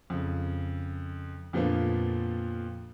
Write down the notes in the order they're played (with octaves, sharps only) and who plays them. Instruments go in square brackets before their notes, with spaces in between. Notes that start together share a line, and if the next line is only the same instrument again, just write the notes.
[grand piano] F2 C#3
F2 A#2 D3 F3 B3 F4